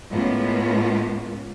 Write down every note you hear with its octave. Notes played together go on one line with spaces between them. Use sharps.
A2 G#3 A#3 B3 C#4 F4